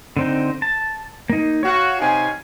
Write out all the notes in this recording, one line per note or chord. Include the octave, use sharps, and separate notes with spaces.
D3 C4 D#4
A5
A#3 D#4
F#4 C#5 F5
C3 D#4 G#5